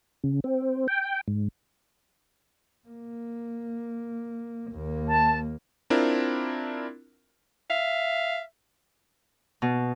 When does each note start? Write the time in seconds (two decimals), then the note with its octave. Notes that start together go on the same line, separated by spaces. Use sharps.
0.24 C#3
0.44 C4
0.88 G5
1.28 G#2
2.88 A#3
4.71 D#2 A#3
5.09 A5
5.90 C4 D4 E4 F4 A#4
7.70 E5 F5
9.62 B2